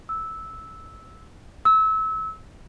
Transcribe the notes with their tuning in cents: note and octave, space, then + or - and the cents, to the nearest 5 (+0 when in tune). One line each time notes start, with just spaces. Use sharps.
E6 -10
E6 -25